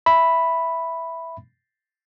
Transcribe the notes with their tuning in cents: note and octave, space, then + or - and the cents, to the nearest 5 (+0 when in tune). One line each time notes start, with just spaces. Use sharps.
E5 +0 B5 +0